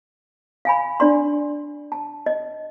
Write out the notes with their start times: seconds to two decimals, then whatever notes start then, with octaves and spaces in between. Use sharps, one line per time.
0.65 F5 G#5 B5
1.00 D4 D5 C6
1.92 A5
2.26 D#5